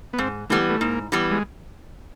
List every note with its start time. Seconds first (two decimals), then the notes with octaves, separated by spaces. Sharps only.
0.13 B3
0.18 G#2 C4
0.50 E3 G3 A3 B3
0.69 A3
0.81 G#2 A#3
1.12 E3 G3 B3
1.31 G#3